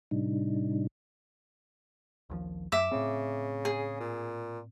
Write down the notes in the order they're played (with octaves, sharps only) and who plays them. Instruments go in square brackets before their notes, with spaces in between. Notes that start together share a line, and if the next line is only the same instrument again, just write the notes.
[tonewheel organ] A2 C3 G3 D4 D#4
[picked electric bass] A#1 D#2 F3
[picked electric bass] F#2 [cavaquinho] E5 D6
[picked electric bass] A2 C4 [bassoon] C#3
[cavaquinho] G#4
[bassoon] A#2